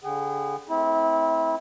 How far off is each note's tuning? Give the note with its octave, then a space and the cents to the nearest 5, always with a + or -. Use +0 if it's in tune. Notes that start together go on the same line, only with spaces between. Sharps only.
D3 -35 G#4 -25 F#5 +45
A3 +0 C4 +0 E4 -25